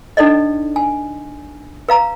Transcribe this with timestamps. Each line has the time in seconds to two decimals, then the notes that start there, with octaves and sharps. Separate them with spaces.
0.17 D4 D#4 A4 D5 D#5
0.76 G#5
1.89 B4 F5 A#5